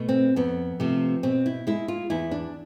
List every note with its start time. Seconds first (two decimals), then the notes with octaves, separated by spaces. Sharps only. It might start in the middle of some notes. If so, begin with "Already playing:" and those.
Already playing: B2 A3
0.09 C4
0.36 F2 B3
0.80 C3 F3 A3
1.23 B2 C4
1.46 E4
1.67 G#3 E4
1.88 F4
2.10 E2 E4
2.31 D4